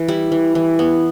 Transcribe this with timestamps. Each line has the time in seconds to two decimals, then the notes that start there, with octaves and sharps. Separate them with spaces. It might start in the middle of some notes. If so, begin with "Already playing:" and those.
Already playing: E3
0.08 G3 E4
0.32 E3
0.55 E3
0.79 B3